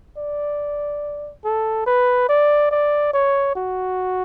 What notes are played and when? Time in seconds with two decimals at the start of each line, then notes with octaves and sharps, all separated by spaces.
0.17 D5
1.45 A4
1.86 B4
2.29 D5
2.71 D5
3.13 C#5
3.56 F#4